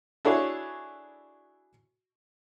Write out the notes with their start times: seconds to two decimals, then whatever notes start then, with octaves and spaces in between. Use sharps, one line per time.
0.25 D4 E4 F#4 G#4 A4 C#5